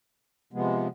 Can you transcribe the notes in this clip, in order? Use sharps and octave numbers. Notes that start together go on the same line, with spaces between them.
C3 F3 G#3 B3